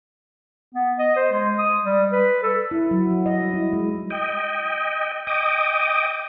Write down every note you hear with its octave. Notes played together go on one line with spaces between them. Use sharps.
B3
D#5
C5
G#3
D#6
G3
B4
A4
E4
F#3
F#4
D#5
G3
E4
G#3
D#5 G5
D#5 G5 D6 D#6